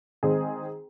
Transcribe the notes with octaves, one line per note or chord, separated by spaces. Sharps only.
D#3 G#3 C4 G#4